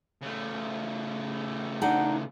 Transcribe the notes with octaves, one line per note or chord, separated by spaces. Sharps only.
C#3 A3
D4 D#4 F#5